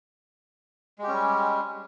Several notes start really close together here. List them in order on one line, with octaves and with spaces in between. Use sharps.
G#3 G4 C#4 G3